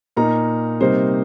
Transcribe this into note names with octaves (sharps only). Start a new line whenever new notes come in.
A#2 A#3 D#4 A#5
C3 G3 A#3 D#4 C5